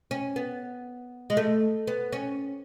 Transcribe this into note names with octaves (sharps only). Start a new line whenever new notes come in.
C#4
B3
G#3
A3
B3
C#4